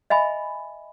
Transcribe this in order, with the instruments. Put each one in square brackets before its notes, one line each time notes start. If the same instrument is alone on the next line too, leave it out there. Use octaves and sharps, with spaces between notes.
[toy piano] D#5 E5 G#5 B5